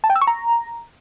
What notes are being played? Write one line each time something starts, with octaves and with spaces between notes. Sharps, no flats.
A5
G5
E6
C#6
A#5